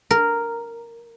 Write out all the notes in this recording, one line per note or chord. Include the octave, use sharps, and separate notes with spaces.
A#4